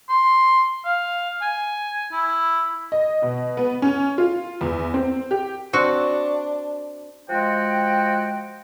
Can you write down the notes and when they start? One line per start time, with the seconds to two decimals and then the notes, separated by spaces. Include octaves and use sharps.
0.09 C6
0.85 F5
1.42 G#5
2.12 E4
2.92 D#5
3.22 B2
3.57 B3
3.82 C#4
4.18 F4
4.61 E2
4.94 C4
5.31 G4
5.73 C4 D4 F#4
7.29 F3 G#3 F#4 G5